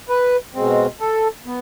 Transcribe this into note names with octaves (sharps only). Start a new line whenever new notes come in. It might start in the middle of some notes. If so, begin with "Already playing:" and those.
B4
B2 G#3 C4
A4
B3